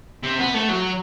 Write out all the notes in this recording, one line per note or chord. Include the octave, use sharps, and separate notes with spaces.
C3
B3
A3
F#3